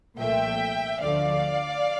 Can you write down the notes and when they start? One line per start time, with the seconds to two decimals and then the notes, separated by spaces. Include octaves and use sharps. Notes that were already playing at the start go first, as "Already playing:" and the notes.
0.19 C2 A#2 F3 A3 E5 G5
1.02 D2 D3 F3 A3 D5 F5